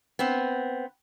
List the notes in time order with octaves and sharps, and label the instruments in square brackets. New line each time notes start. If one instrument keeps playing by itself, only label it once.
[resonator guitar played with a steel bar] B3 C4